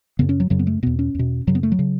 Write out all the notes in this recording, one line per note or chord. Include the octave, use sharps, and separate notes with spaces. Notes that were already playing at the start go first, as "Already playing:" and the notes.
F#2 C#3 B3
C#4
F#3
F#2 C#3 F#3
B3
A3
E2 B2 B3
C#4
E2 B2
F#2 C#3 F#3
B3
A3
F#3
C#3